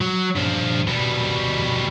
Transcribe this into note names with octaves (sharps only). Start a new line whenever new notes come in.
F#3
G2 F3
B2 G3